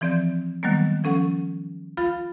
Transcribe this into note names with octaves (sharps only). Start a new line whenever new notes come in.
E3 F3 C4 D5 G6
D#3 F#3 G3 A#3 B3
F3 C#4 A4 F#5 C#6
F4 F5 B5 A6